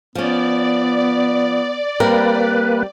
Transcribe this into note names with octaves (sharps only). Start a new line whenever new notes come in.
F3 B3 C#4 D5
G3 A#3 C4 A#4 B4